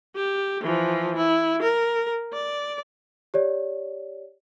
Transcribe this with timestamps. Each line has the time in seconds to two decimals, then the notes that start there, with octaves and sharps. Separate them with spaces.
0.16 G4
0.63 E3 F3
1.17 E4
1.62 A#4
2.33 D5
3.34 G4 C#5 D5